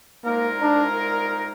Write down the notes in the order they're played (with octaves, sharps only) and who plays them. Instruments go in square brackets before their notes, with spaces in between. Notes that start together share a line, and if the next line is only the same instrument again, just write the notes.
[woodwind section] C2 A#2 G#3 D#4 A#4 [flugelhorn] A#3
[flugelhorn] D4